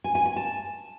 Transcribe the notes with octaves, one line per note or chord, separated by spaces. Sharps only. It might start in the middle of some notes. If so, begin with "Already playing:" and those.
G#5
G#5
G#5
A5